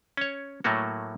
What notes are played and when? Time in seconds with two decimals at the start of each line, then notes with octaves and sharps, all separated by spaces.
0.17 C#4 C#5
0.64 A2 F#3 A3 A#3 F#4